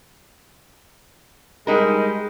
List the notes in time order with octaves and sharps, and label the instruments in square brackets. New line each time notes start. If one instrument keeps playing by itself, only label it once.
[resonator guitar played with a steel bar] G3 D#4 A#4 [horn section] G#3